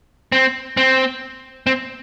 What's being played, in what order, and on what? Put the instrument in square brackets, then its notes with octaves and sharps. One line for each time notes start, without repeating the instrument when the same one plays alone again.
[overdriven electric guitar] C4
C4
C4